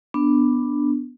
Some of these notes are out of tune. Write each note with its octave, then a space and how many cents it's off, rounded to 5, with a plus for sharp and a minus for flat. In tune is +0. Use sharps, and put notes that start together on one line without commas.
B3 +0 D4 +0